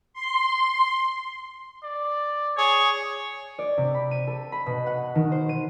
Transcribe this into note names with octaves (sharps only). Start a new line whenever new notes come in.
C6
D5
G#4 C#5
D5
C3
B5
D#7
A4
B5
B2
F#5
D#3
C5
D#7